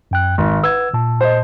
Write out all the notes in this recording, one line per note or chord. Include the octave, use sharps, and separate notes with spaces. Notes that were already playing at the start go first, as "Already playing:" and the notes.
F#2 G5 F#6
G#1 D#3
B4 F#5 E6 G#6
A#2 A5
C5 D#5